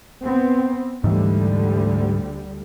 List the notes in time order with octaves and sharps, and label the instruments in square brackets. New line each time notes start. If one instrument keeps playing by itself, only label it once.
[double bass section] B3 C4
[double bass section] D2 D3 G3 [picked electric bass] G#2 E3